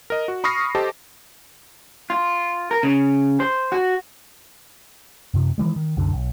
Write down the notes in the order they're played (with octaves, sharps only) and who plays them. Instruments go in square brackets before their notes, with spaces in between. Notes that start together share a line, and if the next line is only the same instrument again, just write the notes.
[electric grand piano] A#4 D#5
F#4
B5 C#6 D#6 F6 A#6 C7
G4 A4 C5 D#5 A5
[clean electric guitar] F4
A#4
C#3
C5
F#4
[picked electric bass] F#2 C3
D#3 E3 G3 G#3
D#3
C2 F#2 D3
B1